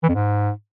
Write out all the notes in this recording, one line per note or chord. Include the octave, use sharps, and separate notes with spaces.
E3
F2
G#2